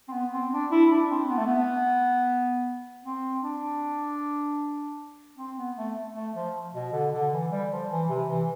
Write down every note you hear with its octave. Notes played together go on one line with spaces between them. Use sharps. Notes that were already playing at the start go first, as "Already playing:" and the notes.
C4
B3
C4
D4
E4
D4
C4
B3
A3
B3
C4
D4
C4
B3
A3
A3
F3
B2
D3
D3
E3
G3
F3
E3
C3
E3